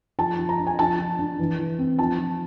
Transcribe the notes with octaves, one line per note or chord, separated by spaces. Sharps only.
F3 A5
F3
A#5
D4
G#5
F3 A5
F3
D4
E3
E3
C4
F3 A5
F3